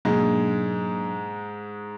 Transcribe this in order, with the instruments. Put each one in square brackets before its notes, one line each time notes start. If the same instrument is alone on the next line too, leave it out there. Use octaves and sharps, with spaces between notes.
[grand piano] G#2 G#3 [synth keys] B2 F#3 A#3 D4